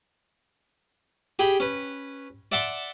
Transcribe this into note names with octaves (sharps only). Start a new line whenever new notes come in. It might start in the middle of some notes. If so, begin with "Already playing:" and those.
G4 G#4 G5 B5
C#4 B4
D5 E5 F#5 A5 C6 D6